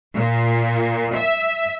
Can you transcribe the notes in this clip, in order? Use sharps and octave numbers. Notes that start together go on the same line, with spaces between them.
A#2
E5